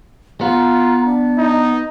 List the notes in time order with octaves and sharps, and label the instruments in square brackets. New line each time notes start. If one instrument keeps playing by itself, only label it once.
[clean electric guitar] B3 [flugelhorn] F4 [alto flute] A#5
[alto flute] D4
[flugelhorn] D#4